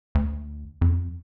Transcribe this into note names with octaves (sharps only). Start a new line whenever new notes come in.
D2
F2